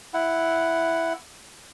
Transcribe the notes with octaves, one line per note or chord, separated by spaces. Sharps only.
E4 F#5